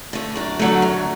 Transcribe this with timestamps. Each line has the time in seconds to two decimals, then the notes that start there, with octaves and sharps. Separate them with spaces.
0.13 D3 A3
0.36 F#2 D4
0.59 D3 F#3 A3
0.82 F#2